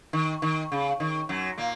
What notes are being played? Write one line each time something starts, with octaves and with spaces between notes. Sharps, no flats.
D#3
D#3
C#3
D#3
F#2 F#3
A#2 A#3